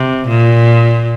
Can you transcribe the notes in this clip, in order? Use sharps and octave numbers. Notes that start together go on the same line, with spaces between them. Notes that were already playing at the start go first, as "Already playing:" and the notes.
Already playing: C3
A#2